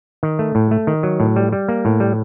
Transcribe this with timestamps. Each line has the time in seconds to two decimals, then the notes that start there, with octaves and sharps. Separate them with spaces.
0.23 D#3
0.39 A3
0.55 A2
0.71 A3
0.87 D#3
1.03 F#3
1.20 A2
1.36 G3
1.53 G3
1.69 A#3
1.85 A2
2.00 G3